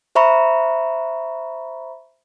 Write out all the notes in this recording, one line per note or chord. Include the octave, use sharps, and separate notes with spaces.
C5 E5 A#5 B5 C#6